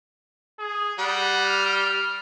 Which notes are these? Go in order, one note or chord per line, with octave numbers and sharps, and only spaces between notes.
G#4
G3 F#5
F6